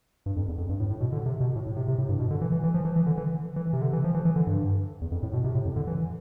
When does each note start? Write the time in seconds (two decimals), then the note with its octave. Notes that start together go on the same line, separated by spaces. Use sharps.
0.26 G2
0.36 F2
0.48 E2
0.58 F2
0.69 G2
0.80 A2
0.90 A2
1.01 B2
1.13 D3
1.26 C3
1.40 B2
1.55 A2
1.67 A2
1.77 C3
1.88 C3
1.98 A2
2.09 G2
2.19 B2
2.31 D3
2.41 E3
2.52 E3
2.64 E3
2.74 F3
2.85 E3
2.96 E3
3.06 D3
3.18 E3
3.56 E3
3.73 C3
3.82 D3
3.93 E3
4.04 F3
4.14 E3
4.25 E3
4.36 D3
4.47 G2
5.01 E2
5.12 F2
5.23 A2
5.33 B2
5.44 C3
5.55 A2
5.65 F2
5.76 D3
5.87 E3